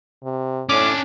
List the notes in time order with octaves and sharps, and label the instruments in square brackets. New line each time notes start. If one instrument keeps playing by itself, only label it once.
[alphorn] C3
[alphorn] A2 [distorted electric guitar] C#4 D4 [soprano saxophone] D6